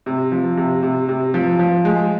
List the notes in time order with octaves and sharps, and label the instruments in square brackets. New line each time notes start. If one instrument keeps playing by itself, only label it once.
[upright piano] C3
F3
C3
C3
C3
F3
F3
G#3